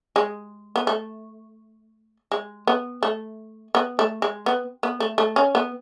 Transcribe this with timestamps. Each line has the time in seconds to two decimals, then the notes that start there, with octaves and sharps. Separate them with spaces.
0.16 G#3
0.76 B3
0.87 A3
2.32 G#3
2.67 B3
3.03 A3
3.75 B3
3.99 A3
4.22 G#3
4.46 B3
4.83 B3
5.00 A3
5.18 A3
5.36 C#4
5.55 B3